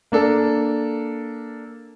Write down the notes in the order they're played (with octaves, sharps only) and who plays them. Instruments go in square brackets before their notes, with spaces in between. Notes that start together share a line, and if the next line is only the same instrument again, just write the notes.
[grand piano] A#3 D4 A4